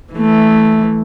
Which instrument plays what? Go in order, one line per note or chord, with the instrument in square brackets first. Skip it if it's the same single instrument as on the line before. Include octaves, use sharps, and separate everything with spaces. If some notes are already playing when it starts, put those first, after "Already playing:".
[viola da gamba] E3 A3